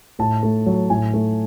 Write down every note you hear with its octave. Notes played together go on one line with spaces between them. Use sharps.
A2 A5
A3
F#3
A2 G#5
A3